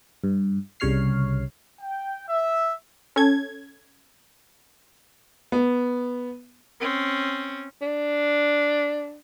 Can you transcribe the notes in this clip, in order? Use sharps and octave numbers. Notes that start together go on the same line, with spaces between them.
G2
C2 C#3 G3 C#5 F6 C7
G5
E5
C#4 A4 G#6
B3
C4 C#4
D4